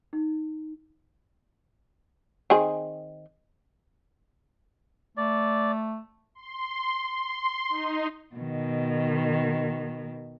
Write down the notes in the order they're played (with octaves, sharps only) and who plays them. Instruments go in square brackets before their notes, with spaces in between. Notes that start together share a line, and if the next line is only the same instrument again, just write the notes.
[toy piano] D#4
[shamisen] D#3 C4 G#4
[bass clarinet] A3 [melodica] D5
[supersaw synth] C6
C6
D#4
[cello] B2 D#3